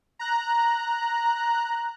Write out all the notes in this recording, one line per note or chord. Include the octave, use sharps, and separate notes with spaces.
A#5 F#6